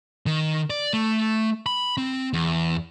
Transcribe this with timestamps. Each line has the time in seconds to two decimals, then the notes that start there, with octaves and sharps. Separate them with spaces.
0.26 D#3
0.70 D5
0.93 A3
1.66 B5
1.97 C4
2.33 E2